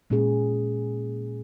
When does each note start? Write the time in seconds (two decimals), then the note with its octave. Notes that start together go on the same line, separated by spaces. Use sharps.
0.10 A#2 G#3 C#4 G#4